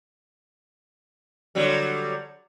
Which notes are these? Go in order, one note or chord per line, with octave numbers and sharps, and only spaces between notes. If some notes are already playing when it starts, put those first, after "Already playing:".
D3 F#3 G3